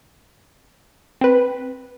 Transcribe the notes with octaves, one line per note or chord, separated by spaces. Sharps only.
C4 B4